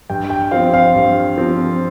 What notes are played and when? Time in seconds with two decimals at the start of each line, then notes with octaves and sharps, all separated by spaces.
0.10 G2 G5
0.30 G5
0.51 F3 C4 F5
0.74 F5
0.95 G2
1.38 F3 C4